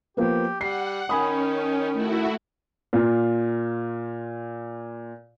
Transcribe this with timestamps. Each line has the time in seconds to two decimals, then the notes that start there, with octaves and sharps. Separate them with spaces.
0.17 F3 A#3 B3 G4
0.61 G3 F#5 C7
1.09 D#3 C#4 G#5 B5 D#6
1.93 A3 E4 F#4
2.93 A#2 F4